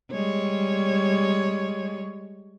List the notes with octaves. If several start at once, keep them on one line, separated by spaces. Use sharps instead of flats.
G3 G#3 C#5